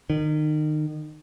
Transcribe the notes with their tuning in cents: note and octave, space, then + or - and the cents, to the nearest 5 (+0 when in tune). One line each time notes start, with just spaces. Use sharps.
D#3 -30